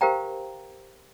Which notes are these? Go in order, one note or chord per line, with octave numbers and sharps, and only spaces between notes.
G4 A#4 C5 F5 G5 A#5